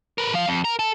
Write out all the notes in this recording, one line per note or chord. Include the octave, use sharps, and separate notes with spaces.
A#4 B4
F3 F5
F2
A#4
A4